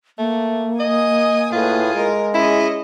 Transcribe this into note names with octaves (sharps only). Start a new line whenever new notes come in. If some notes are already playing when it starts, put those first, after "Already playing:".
A3 A#3
D#5 G#5 D#6
A2 F4 G#4 B4
G#3 A#4
C#4 E4 G#4 D#5